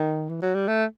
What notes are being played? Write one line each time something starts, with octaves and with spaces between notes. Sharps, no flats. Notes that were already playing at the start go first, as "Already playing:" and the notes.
Already playing: D#3
E3
F#3
G3
A3